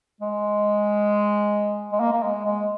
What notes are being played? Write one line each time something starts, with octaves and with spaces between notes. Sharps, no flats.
G#3
G#3
A#3
A#3
G#3
G#3